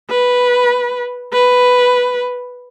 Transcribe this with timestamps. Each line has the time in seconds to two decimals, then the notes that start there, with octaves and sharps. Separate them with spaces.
0.10 B4
1.33 B4